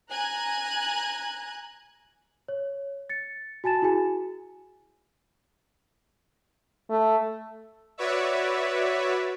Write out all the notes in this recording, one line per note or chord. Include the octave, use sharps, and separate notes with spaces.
G#5 A#5 F#6 G#6
C#5
A6 C#7
F#4 G#5 A5 A6 E7
E4 F#4 G#4 G#5
A3
F#4 B4 C#5 D5 E5